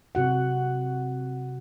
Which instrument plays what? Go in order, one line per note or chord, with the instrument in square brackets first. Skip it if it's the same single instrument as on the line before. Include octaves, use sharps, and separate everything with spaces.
[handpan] C3 F#4 F#5